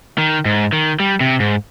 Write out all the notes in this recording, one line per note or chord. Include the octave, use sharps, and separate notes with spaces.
D#3
G#2
D#3
G3
C3
G#2